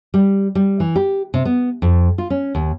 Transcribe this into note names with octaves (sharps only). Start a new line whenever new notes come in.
G3
G3
E3
G4
C3
B3
F2
F4
C#4
D#2